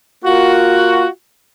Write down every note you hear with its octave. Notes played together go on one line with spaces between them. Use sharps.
A#3 F4 F#4